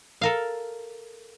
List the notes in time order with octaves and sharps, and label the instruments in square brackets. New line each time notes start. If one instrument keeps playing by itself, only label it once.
[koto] A4 A#4 F5